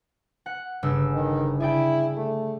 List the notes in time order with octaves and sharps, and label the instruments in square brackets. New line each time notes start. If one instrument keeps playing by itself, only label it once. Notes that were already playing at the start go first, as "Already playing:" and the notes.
[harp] F#5
G1 C#3 E6
[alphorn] D#3
[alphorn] E4 [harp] G#4 D5 G5
[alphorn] A3